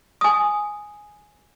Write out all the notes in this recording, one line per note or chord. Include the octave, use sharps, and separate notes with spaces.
G#5 D#6